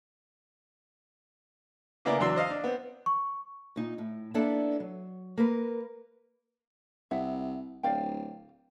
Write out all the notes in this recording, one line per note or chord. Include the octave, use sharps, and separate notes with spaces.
C#3 A#3 B3 E4 D5
E2 E3 F#3 D4 C6 E6
C5 D#5 F5
D4
B3 C4
C#6
A#2 D#4
A2
A#3 B3 D4 E4 A4 D5
F#3
A#3 A#4 B4
C2 E5 F#5
D1 D5 F5 G5